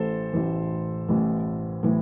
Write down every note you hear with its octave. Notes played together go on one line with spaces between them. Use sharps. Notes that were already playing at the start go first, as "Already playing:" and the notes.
Already playing: A1 A2 E3 A4 C5
A1 A2 E3
A1 A2 E3
A2 E3